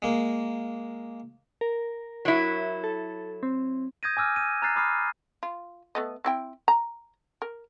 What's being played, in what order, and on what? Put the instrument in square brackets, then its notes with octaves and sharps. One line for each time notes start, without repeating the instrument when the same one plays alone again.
[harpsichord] G#3 A#3
[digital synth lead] A#4
[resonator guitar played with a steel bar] F#3 E4
[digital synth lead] A4
C4
[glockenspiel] D#6 G6 G#6 A#6 D#7
G#5 D6 E6 F6
D#7
A#5 F6 F#6 A6 C7
B5 D6 D#6 F6 C7
[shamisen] F4
A3 B3 D#5
C4 E4 G5
A#5
A#4